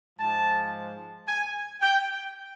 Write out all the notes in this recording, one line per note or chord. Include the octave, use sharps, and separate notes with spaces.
G#2 F3 G#3 A5
G#5
G5